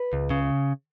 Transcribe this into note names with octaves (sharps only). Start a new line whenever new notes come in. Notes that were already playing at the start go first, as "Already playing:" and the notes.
Already playing: B4
C#2
C#3